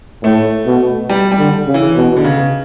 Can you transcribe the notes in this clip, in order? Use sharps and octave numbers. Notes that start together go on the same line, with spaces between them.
A2 A3
B2
G3
G3
D3
C#3
E3
B2
D3
C#3